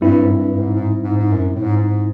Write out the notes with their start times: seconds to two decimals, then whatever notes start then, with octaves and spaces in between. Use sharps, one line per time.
0.01 G2 G3 C4 E4
0.23 G#2
0.31 G2
0.52 G2
0.59 G#2
0.75 G#2
1.03 G#2
1.18 G#2
1.32 F#2
1.55 A2
1.62 G#2
1.77 G#2